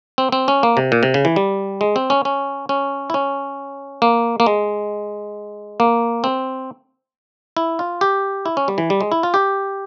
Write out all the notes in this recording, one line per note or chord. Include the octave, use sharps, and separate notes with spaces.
C4
C4
C#4
A#3
C3
A#2
C3
C#3
E3
G3
G#3
C4
C#4
C#4
C#4
E4
C#4
A#3
A#3
G#3
A#3
C4
E4
F4
G4
E4
C#4
G3
E3
G3
G#3
E4
F4
G4